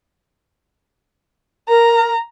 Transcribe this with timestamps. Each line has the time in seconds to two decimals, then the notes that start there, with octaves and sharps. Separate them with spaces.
1.69 A#4 A#5